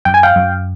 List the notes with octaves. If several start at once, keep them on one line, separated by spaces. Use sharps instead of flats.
F#2 G5
G#5
F5 G5
F#2